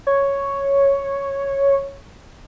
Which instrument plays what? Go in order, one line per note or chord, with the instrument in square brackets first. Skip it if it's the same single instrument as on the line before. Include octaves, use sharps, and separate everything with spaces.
[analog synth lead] C#5